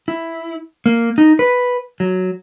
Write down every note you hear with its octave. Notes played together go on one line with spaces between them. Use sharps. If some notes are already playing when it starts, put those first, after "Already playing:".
E4
A#3
D#4
B4
F#3